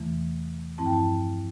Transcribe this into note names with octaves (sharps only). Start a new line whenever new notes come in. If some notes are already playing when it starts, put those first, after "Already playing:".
Already playing: E2 C3 E3 A3
G2 F3 C4 E4 A5
G5
A5